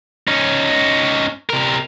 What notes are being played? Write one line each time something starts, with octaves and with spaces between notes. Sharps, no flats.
C#4 D#4
C3 A#4